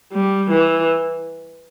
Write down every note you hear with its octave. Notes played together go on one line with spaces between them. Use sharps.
G3
E3